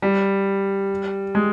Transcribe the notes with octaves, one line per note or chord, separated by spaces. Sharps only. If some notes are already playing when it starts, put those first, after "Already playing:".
G3
G#3